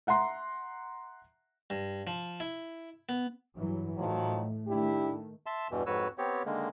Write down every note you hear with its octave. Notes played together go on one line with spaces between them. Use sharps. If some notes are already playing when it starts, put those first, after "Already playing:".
E5 F#5 A#5 C6
G2
F3
E4
B3
G2 E3 F#3
A2 D#3 F3 F#3 A3
D#3 A3 D4 E4 G4
E5 A5 C6
E2 G2 B2 E3
F2 G#2 F#4 B4 C#5 E6
B3 C4 G4 C#5
D3 D#3 G#3 A#3